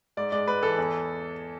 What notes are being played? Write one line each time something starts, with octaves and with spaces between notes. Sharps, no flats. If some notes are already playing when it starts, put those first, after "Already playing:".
G#2 D5
G#3 D5
G#2 B4
E3 A4
E2